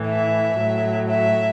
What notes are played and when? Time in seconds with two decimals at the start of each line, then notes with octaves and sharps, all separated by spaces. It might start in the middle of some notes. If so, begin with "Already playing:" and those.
Already playing: A2 E3
0.08 E5
0.59 A2 F#3
1.10 E5